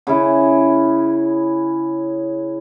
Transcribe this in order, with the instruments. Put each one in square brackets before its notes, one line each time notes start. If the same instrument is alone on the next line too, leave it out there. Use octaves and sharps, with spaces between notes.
[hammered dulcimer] C#3 E4